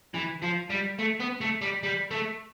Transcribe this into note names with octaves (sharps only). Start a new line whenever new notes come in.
E3
F3
G3
A3
B3
A3
G3
G3
A3